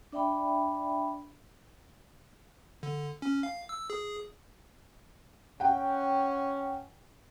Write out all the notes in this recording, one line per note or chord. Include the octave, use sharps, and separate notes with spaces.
D4 D5 E5 G5 B5
D3
C#4
F5
E6
G#4
C#4 F#5 G5